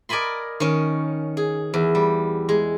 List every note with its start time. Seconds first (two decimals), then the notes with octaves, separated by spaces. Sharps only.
0.09 A#4 D5 D#5 G#5 B5 C6
0.60 D#3 C#4
1.37 G#4
1.74 E2
1.95 G3
2.49 G#3